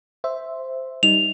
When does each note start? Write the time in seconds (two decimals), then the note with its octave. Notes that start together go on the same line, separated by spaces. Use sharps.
0.24 C5 E5
1.03 G3 D#4 F7